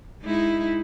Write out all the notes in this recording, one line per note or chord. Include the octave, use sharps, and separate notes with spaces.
G#3 D#4 E4